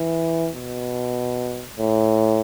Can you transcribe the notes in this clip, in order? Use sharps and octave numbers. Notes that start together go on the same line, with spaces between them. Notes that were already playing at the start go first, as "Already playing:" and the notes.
Already playing: E3
B2
A2